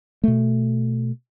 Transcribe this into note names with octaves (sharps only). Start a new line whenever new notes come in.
B2 A3